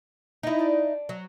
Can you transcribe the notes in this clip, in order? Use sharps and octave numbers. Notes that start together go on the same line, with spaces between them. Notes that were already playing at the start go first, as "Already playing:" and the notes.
D#4 E4
D4 D5
F#3